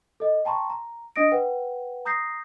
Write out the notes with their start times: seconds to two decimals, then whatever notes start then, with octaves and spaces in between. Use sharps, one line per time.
0.20 A4 D#5
0.45 G5 A5 A#5 C6 C#6
0.70 A#5
1.16 D4 D#5 D#6 A#6 D7
1.32 B4 F#5 G5
2.05 A#5 D#6 G6 A#6 C7